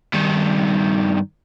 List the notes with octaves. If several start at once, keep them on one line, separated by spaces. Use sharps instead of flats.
G2 D#3